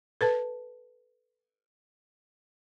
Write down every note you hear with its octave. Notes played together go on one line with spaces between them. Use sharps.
A4 B4 A5